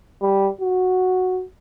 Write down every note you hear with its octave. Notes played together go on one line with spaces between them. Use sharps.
G3
F#4